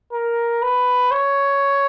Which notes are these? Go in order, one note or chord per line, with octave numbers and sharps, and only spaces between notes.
A#4
B4
C#5